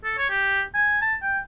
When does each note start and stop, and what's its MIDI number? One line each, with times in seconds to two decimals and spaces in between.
0.04 0.13 69
0.18 0.26 73
0.30 0.61 67
0.74 0.98 80
1.01 1.14 81
1.22 1.39 79